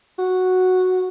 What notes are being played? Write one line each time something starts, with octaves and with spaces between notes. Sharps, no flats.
F#4